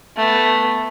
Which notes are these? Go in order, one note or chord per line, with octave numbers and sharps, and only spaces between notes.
A3 B3